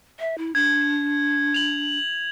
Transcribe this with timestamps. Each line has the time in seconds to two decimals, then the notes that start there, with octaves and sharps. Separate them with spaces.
0.20 E5
0.38 E4
0.55 D4 G#6
1.54 F7 F#7